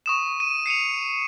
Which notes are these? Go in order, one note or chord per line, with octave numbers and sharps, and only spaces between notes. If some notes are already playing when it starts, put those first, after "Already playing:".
C#6 D#6 E7
D#7
C7 C#7 D#7 F7